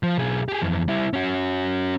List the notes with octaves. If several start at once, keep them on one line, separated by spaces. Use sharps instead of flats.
F3
B1 G#4
G4 G#4
F2 E3
G3 E4
C#4 F#4